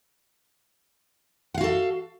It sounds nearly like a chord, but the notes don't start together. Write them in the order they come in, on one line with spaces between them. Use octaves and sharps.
F#5 F5 F#4 A4